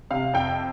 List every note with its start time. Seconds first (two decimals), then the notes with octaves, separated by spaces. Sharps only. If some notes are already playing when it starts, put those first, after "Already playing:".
0.11 C3 F5
0.33 F2 G5